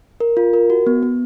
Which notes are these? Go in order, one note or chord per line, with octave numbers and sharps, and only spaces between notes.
A#4
F4
A#4
F#4
B3
B3